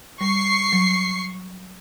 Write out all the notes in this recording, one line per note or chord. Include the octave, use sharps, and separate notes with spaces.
G3 C#6 C7 C#7
F#3